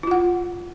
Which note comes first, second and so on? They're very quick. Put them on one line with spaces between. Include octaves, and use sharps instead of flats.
E4 F4 F#5